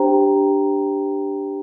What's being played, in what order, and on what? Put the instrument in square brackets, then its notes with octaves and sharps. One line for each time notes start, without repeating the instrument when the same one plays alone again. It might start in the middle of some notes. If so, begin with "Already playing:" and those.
Already playing: [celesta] D4 G4 C5 G5 A#5